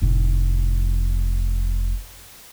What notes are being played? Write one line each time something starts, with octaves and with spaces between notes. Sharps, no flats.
F1 A2